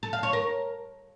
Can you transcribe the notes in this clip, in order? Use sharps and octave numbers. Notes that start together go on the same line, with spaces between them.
A4
F5
C#5
A#4